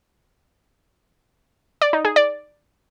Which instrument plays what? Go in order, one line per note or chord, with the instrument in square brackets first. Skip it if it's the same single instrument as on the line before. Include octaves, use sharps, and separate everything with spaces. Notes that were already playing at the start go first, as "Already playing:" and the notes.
[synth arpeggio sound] D5
D#4
G#4
D5